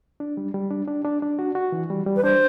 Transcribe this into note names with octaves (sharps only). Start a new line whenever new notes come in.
D4
G3
G3
D4
D4
D4
D4
F#4
F#4
E3
G3
G3
B4
D4 C5